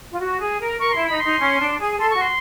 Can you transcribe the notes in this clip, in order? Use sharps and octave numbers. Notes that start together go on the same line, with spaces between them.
F4
F#4
G#4
A#4
A#4 C#6
E4 C6
D#4 B5
D#4 C6
C#4
D4
G#4
A4 C6
F#4 C#6
C6